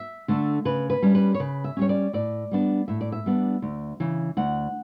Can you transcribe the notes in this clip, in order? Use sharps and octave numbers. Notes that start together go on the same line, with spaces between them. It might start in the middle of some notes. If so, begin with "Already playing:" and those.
Already playing: E5
D3 A3 D4
C#3 B4
B4
G3 C#4
B4
C#5
C#3 B4
E5
G3 C#4 C#5
D5
A2 D5
G3 B3 D4
A2 E5
D5
E5
G3 B3 D4
D2
C#3 E3
D2 F#5